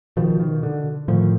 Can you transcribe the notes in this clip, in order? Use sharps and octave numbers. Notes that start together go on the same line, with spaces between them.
B2 D#3 F3
D#3
D3
A2 D#3 F3